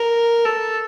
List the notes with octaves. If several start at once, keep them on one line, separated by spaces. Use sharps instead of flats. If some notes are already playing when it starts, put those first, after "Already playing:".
Already playing: A#4
A4